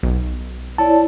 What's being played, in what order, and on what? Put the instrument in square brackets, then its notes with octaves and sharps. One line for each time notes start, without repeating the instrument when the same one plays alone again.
[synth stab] B1
[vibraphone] E4 C#5 D5 [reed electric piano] A5